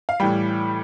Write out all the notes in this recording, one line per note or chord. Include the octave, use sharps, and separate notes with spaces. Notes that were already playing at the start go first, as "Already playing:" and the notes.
F5
A2 E3 G3 G5